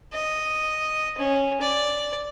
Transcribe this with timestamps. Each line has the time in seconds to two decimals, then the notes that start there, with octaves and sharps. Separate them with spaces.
0.13 D#5
1.18 C#4
1.61 D5